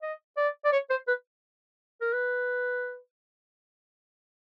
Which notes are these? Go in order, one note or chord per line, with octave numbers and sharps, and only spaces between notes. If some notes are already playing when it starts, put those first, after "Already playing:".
D#5
D5
D5
C#5
C5
B4
A#4
B4